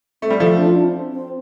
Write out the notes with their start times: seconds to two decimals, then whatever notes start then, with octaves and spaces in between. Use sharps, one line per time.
0.22 A3 C4
0.30 G3
0.40 F3 A3
0.57 D4
0.67 F4
0.75 D4
0.85 C4
1.12 C4